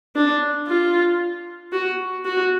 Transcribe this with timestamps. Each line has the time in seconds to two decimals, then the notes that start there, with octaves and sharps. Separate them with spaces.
0.15 D4
0.67 F4
1.72 F#4
2.25 F#4